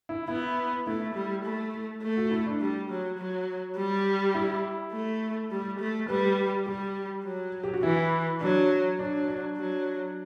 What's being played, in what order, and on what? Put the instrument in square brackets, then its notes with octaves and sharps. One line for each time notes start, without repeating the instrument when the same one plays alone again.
[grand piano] E4
[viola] B3 [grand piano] E4
[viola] A3 [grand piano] E4
[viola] G3
A3
A3
[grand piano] F#4
E4
D4
[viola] G3
F#3
F#3
G3
[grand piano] E4
[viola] A3
G3
A3
[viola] G3 [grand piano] B4
[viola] G3 [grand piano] G4
[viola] F#3
[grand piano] G4
F#4
[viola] E3 [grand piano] E4
[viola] F#3 [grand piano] D4
[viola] F#3 [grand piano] D4
[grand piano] D4
[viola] F#3